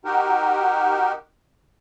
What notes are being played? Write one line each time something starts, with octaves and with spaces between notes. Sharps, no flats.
D#4 F#4 G4 A#4